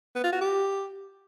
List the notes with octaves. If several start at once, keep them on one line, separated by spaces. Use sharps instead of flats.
B3
F4
F#4
G4